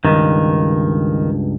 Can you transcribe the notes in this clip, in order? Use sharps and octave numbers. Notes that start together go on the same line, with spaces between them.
C#2 G2 D#3